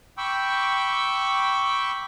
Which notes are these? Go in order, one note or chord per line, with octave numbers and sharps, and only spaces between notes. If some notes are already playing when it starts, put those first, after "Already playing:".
G5 B5 C#6 D6 E6